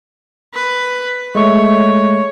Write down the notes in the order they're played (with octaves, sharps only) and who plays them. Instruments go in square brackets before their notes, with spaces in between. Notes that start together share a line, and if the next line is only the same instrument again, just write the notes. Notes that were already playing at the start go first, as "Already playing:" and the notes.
[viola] B4
[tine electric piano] G#3 A3 C#6 [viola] C#5